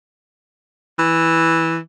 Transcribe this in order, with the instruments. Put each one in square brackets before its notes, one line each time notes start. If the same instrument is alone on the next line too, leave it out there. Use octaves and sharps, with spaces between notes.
[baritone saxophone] E3